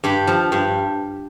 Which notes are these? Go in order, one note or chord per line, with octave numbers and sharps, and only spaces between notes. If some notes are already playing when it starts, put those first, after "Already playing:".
G2 G4
F3
G2